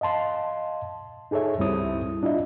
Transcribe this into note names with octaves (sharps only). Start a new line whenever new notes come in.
D#5 F5 A5 C6
D#4 G#4 A4 C#5 E5
C#2 G2 G3 C4 E4 D#6
D4 E4 F4 D#5 E5